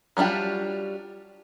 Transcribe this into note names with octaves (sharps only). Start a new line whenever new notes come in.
F#3 G3 D4 F4 G4